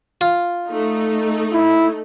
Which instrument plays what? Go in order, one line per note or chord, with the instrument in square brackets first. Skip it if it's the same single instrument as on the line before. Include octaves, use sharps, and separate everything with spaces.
[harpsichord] F4
[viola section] A3 D#4
[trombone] E4